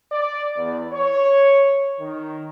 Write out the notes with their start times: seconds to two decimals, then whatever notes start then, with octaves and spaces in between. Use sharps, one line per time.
0.12 D5
0.56 E2
0.93 C#5
2.00 D#3